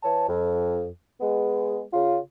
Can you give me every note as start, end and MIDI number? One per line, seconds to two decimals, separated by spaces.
0.03 0.27 52
0.03 0.27 73
0.03 0.27 81
0.29 0.87 41
1.21 1.81 56
1.21 1.81 59
1.93 2.18 49
1.93 2.18 65